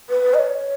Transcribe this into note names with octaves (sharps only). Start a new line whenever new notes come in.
B4
D#5
C#5